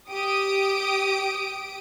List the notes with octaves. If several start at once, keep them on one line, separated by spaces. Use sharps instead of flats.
G4 D#6 D7